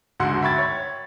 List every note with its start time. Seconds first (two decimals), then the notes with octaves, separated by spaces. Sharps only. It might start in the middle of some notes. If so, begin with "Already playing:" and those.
0.20 D2 G#2 D3 F#4 F#5 C6
0.42 E5 G5 B5 C#6 G#6 A6
0.56 C#5 A6